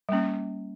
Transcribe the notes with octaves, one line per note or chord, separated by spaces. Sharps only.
G3 A#3 C#4